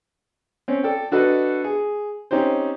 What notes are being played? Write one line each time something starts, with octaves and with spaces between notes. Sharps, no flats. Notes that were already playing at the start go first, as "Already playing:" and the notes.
C4 C#4
A4 D5 G5
D4 F#4 A4 B4 D#5
G#4
C4 C#4 D#4 G4 C5